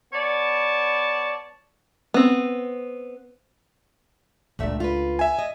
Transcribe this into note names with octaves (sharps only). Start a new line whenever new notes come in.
B3 C#5 D5 A5
B3 C4
C#2 A#2 A3 D4 E5
F4 B4
E5 G#5
D#5